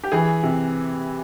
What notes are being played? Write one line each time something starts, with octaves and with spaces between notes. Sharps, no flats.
G4
E3 G#4
C3